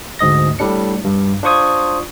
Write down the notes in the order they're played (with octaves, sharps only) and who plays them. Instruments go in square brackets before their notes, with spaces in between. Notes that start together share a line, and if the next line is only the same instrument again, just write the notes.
[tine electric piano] D2 G#2 D#5 A#6
A2 G3 D4 C#7
G2
D4 F4 C5 C#6 D#6 G#6